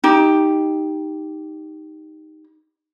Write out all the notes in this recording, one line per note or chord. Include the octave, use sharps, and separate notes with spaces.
D#4 G4